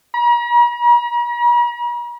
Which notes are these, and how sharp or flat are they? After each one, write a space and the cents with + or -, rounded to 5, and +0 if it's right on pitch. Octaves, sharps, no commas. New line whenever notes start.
A#5 +45